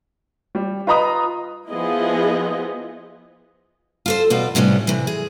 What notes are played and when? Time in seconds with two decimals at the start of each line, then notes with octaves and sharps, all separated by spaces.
0.55 G3
0.87 F4 B4 D#5 A#5 B5 D#6
1.70 F3 B3 E4 F4 G#4 D#5
4.06 F4 A4 C5
4.30 E2 B2 F4 D5
4.55 A2 C3 G3 B3 C#4
4.87 C3 E3
5.07 G#4